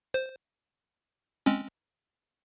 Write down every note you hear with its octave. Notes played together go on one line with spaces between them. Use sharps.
C5
G#3 C4 C#4